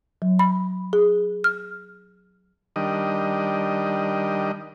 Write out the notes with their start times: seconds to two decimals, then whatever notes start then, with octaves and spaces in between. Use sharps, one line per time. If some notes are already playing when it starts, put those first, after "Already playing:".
0.22 F#3
0.39 B5
0.93 G#4
1.44 F6
2.76 D#3 G3 D4 D#5